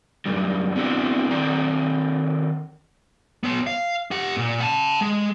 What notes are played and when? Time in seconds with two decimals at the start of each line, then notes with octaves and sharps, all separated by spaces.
0.25 F#2 A2 G3
0.76 B3 C4 D4 E4 F#4
1.31 D#3 C4 A4 D5 A#5
3.43 B3 C#5
3.67 F5
4.11 G4 F#5
4.37 A#2
4.60 F#5 A5
5.01 G#3